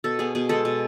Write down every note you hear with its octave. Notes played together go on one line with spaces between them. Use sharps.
B2 A4
B3 G#4
B2 G#4
G#3 A4
B2